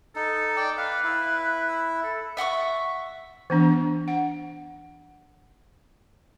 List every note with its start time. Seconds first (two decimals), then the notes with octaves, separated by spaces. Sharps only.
0.16 D#4 A4
0.57 D5 G5
0.78 B4 F5
1.04 E4
2.03 A4
2.37 E5 F#5 C6 C#6
3.50 E3 B3 D4
4.08 F#5